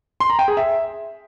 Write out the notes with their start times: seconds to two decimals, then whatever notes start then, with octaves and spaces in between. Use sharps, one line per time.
0.20 C6
0.30 A#5
0.39 G5
0.48 G#4
0.57 E5